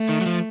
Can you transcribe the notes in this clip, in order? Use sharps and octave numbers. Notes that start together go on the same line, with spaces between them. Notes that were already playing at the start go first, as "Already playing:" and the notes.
Already playing: A3
D#3
F#3
F3